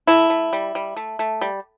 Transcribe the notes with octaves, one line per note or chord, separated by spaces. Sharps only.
A3 E4
A3
G3
G3
A3
A3
G3